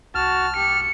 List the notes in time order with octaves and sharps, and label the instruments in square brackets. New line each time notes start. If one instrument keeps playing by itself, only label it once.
[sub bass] C2 [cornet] F#4 [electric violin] A5 [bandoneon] F6
[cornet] G4 [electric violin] C#7